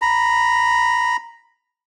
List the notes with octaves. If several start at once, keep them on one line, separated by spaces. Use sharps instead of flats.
A#5 B5